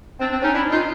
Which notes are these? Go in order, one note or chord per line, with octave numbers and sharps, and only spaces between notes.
C4 D4
C4 D4
C#4 D#4
D4 E4
D#4 F4